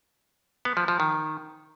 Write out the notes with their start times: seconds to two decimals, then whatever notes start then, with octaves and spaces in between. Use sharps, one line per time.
0.65 B3
0.77 F3
0.88 F3
1.00 D#3